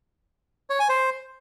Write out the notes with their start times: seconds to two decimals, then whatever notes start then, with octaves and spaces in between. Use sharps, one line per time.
0.70 C#5
0.79 G#5
0.89 C5